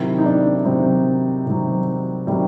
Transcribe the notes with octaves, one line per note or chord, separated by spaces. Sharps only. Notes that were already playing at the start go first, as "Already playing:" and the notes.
Already playing: C3 D#3 F#3 E4
D#4
D4
C3 D#3 F#3 C4
C3 D#3 F#3
C3 D#3 F#3 G3